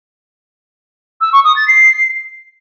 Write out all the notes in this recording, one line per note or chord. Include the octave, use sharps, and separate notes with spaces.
E6
C#6
D#6
A6
C7